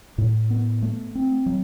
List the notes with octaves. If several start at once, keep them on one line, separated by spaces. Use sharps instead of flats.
A2
B3
A3
C4
F#3